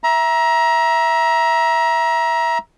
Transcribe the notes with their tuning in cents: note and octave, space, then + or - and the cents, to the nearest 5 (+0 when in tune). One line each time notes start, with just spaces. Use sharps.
E5 +0 A#5 +25